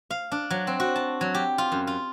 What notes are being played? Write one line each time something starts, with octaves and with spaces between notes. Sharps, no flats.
F5
D4
F#3
C4
F#4
A5
F#3
G4
F4
F#2
F4